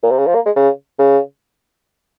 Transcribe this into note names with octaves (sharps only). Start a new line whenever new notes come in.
A#2
C3
C#3
F3
A#3
G#3
C#3
C#3